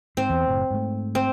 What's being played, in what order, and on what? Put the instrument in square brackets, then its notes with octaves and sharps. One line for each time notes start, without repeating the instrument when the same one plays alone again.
[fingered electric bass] G#2 [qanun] C4
[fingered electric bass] E2
F#1 A2
G#2 A3
[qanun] C4